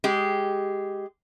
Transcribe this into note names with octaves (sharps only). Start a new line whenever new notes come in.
G#3 G4